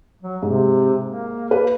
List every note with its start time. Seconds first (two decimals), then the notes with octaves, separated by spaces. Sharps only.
0.22 F#3
0.42 G#2 C3
1.06 A#3
1.51 B4